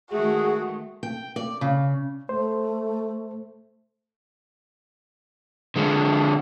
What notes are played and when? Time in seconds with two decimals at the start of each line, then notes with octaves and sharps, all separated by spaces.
0.11 D#3 G#3 A3 F#4 G#4
1.03 G5
1.36 D5
1.61 C#3
2.29 A3 C5
5.76 D3 G#3